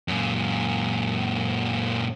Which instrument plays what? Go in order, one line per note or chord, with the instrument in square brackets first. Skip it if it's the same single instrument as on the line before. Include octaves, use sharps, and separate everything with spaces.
[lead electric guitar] F#2 A#2